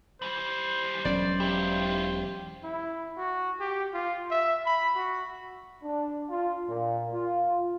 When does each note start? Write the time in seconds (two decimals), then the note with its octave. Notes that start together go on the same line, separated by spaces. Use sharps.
0.22 E3 G3 C5
1.05 E1 F#3 C#4 D5
1.40 E4 F4 G4
2.64 E4
3.17 F#4
3.60 G4
3.94 F4
4.30 E5
4.66 B5
4.96 F#4
5.83 D4
6.29 F4
6.68 A#2
7.12 F4